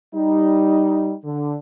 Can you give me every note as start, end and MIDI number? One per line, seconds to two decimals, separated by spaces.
0.15 1.13 55
0.15 1.13 63
1.25 1.55 50